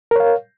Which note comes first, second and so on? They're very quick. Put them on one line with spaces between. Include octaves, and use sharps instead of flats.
A#4 C#5 F5